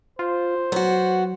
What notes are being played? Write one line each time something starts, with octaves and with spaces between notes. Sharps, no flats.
F4 C5
F#3 B3 F#4